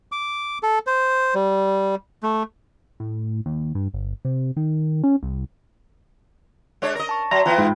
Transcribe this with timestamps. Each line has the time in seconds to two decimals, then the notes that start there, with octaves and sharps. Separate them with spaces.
0.12 D6
0.63 A4
0.87 C5
1.35 G3
2.23 A3
3.00 A2
3.46 D#2
3.75 G2
3.94 G1
4.25 C3
4.57 D#3
5.04 C#4
5.23 C2
6.82 G#3 D4 C#5
6.95 A#4 D#5 A#6
7.09 A5 C#6
7.31 F#3 E5 A#5 C6
7.46 E3 B3 F4 G5 B5
7.58 G#2